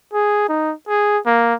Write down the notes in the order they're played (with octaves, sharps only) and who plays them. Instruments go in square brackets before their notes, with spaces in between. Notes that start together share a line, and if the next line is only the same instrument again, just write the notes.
[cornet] G#4
D#4
G#4
A#3